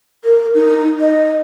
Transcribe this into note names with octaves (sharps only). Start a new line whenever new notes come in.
A#4
D#4
D#5